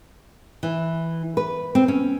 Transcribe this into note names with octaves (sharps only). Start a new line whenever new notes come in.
E3
B4
C4
C#4